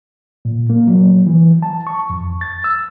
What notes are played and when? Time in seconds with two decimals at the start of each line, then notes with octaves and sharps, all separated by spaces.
0.45 A#2
0.70 A#3
0.87 F#3
1.27 E3
1.62 A5
1.87 C#6
2.10 F2
2.41 A6
2.64 E6